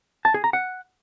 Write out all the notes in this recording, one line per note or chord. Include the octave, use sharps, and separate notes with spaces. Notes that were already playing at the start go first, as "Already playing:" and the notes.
A5
G#4
A#5
F#5